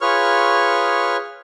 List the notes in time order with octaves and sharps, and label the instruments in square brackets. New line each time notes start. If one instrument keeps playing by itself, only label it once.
[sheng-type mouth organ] F4 G#4 B4 C#5 C#6 F6